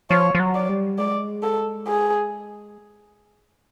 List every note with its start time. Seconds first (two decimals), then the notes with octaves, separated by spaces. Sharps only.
0.10 F3 C#5
0.35 F3
0.40 F#3
0.55 D5
0.69 G3
0.98 G#3 D5
1.43 A4
1.87 G#4